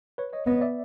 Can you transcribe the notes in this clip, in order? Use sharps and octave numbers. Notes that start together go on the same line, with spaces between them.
B4 C#5
C#5 D#5
B3 C#5 D#5
D5 E5